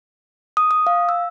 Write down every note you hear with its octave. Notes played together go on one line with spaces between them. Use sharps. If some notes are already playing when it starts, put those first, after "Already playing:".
D#6
D#6
F5
E6